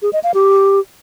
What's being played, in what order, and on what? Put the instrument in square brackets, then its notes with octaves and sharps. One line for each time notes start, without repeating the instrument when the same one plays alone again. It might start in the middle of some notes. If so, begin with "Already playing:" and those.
[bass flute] G#4
D#5
F5
G4